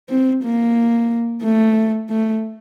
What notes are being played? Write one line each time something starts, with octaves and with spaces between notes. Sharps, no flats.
C4
A#3
A3
A3